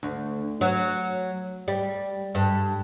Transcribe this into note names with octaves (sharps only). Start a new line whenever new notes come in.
D2
F#3
G3
G2